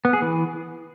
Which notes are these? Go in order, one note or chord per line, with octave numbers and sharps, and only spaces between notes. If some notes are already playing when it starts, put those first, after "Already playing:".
B3
G#4
E3